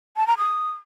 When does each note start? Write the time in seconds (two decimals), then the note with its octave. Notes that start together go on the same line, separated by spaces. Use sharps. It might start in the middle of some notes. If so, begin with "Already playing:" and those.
0.17 A5
0.27 A#5
0.38 D#6